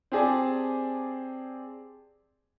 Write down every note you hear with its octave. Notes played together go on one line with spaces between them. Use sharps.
C4 G4 G#4 D5 G#5 A5